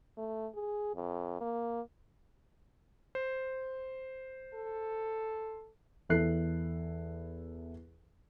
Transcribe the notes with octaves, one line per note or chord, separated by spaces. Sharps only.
A3
G#4
F2
A#3
C5
A4
E2 E4 A4 F#6 C7